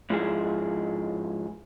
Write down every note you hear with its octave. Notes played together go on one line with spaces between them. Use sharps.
G#2 F3 E4 G#4